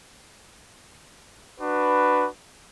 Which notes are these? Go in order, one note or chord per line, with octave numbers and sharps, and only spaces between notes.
D4 F#4 B4